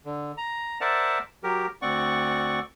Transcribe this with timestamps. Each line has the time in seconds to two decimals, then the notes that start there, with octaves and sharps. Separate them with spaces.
0.05 D3
0.37 A#5
0.81 A#4 C5 D5 E5 F#5 A5
1.43 F#3 G4 A#4
1.82 D2 C4 D5 F#5 C#6